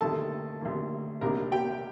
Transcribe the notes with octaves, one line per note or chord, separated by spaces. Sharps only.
D2 C3 D#3 A#3 A4 A5
D2 C3 D#3 A#3
C2 C3 D#3 A#3 D4 A#4 A#5
G4 G5